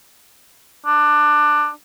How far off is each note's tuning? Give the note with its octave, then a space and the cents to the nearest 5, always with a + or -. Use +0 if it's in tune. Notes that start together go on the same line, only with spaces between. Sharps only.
D4 +15